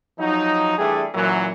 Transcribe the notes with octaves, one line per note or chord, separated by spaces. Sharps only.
F3 F#3 D#4
E3 G3 A3 D4 G#4
F#2 A#2 E3 F#3